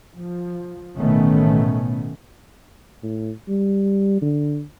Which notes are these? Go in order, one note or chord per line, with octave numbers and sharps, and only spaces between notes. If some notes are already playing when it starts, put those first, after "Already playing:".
F3
A1 B2 D#3 A3 B3 C#4
A2
G3
D3